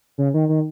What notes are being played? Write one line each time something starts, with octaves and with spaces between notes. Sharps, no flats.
C#3
D#3
D#3